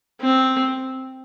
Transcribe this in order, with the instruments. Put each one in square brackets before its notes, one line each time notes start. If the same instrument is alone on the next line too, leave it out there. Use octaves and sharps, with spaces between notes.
[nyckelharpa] C4